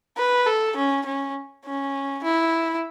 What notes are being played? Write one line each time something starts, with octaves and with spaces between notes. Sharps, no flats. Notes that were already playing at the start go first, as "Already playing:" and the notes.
B4
A4
C#4
C#4
C#4
E4